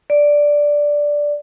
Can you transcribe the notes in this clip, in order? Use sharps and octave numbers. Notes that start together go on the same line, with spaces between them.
D5